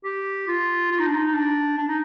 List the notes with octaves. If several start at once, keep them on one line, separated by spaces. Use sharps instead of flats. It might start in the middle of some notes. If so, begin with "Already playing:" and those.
G4
F4
F4
D#4
D4
D#4
D4
D4
D#4